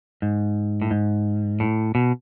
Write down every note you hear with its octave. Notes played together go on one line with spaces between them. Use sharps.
G#2
A2
G#2
A2
B2